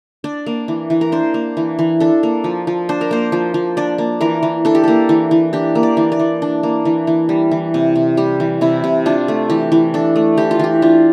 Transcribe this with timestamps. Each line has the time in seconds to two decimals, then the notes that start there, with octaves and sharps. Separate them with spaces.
0.24 D4 D5
0.46 A#3
0.68 E3
0.90 E3
1.01 A#4
1.12 D4 C5
1.34 A#3
1.57 E3
1.79 E3
2.00 D4 A4
2.23 A#3
2.44 F3
2.67 F3
2.89 D4 C5
3.01 A#4
3.11 A#3 C5
3.32 F3
3.54 F3
3.77 D4 D5
3.98 A#3
4.21 E3 A#4
4.43 E3
4.65 D4 A4
4.75 G4
4.84 A#3 A4
5.09 E3
5.31 E3
5.53 D4 G4
5.75 A#3
5.83 D5
5.97 E3
6.12 D5
6.20 E3
6.42 D4
6.63 A#3
6.85 E3
7.07 E3
7.29 G3
7.51 E3
7.74 C3
7.96 C3
8.17 G3 G4
8.40 E3
8.61 C3 E4
8.84 C3
9.06 D4 F4
9.28 A3
9.50 E3 G4
9.72 E3
9.94 D4 A4
10.16 A3
10.37 E3 G4
10.51 F4
10.59 E3 G4
10.82 D4 F4